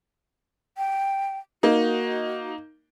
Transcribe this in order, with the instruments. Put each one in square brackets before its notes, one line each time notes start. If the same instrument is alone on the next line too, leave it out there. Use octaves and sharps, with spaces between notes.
[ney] G5
[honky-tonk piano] A#3 D#4 [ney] F#4